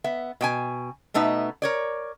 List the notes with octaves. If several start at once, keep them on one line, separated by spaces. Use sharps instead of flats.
B3 E5
B2 G5 G#5
B2 A3 B3 D#4 E5
A#4 C#5 D5